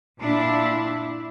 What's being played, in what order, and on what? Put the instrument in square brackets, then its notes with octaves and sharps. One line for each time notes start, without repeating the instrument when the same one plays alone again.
[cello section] A#2 D4 E4